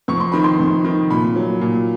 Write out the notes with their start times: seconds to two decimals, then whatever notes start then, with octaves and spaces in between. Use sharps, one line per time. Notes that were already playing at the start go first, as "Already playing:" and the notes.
0.08 F2 C#6
0.20 C6
0.32 C3 D#3 B5
0.44 C6
0.59 F2
0.85 C3 D#3
1.10 A#2 B5
1.36 F#3
1.61 A#2